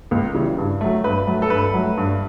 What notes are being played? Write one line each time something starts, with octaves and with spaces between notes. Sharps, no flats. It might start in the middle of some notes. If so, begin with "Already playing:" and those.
C#2
C#3 E3 G3
G2
F#3 A3
G2 B4
F#3 A3
A4
G2 B4
F#3 A3
G2